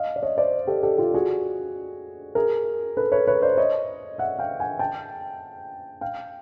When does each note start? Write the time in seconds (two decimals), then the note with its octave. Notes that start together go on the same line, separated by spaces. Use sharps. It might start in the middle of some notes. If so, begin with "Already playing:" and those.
Already playing: D#5 F5
0.16 D5
0.22 C#5 D#5
0.38 C5 D5
0.67 G4 A4
0.83 G4 A4
0.98 F4 G4
1.14 F#4 G#4
2.35 G#4 A#4
2.97 A4 B4
3.12 B4 C#5
3.27 B4 C#5
3.42 C5 D5
3.57 C#5 D#5
4.18 E5 F#5
4.39 F5 G5
4.60 F#5 G#5
4.79 G5 A5
6.01 F5 G5